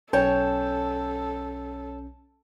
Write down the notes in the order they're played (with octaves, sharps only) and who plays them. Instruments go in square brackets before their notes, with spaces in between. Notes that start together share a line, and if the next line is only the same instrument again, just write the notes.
[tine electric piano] B1 C#4 G6 [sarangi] A4 [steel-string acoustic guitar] C#5 G5 A5